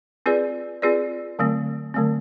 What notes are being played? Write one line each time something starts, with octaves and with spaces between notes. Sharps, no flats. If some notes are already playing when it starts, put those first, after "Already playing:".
C4 F4 G#4 B4 D5
C4 F4 G#4 B4 D5
D3 F#3 A3 C4
D3 F#3 A3 C4